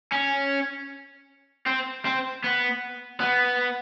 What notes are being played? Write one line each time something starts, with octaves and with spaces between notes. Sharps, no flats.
C#4
C4
C4
B3
B3